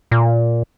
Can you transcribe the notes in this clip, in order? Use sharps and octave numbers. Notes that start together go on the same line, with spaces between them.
A#2